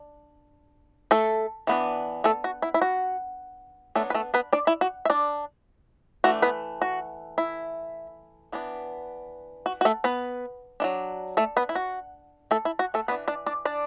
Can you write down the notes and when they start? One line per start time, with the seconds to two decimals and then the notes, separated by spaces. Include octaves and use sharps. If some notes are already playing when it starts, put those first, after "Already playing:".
Already playing: D4
1.11 A3 A4
1.67 E3 B3 D4
2.24 A3 A4
2.44 F#4
2.62 E4
2.74 E4
2.81 F#4
3.95 F#3 A3 B3 D4 A4
4.10 B4
4.14 A3 A4
4.34 B3 B4
4.53 D4 D5
4.67 E4
4.81 F#4
5.05 E5
5.10 D4 D5
6.24 E3 A3 D4 F#4
6.42 B3 B4
6.82 F#4
7.38 E4
8.52 E3 B3 D4
9.66 F#4
9.81 F#4
9.85 A3 A4
10.04 B3 B4
10.80 F#3 A3 D4
11.37 A3 A4
11.57 B3 B4
11.69 E4
11.75 F#4
12.51 A3 A4
12.65 E4
12.79 F#4
12.94 A3 A4
13.08 E3 B3 D4 B4
13.28 D4 D5
13.46 D4 D5
13.65 D4 D5